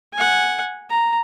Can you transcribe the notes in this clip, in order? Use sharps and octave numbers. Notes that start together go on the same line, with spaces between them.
F#5 G#5
A#5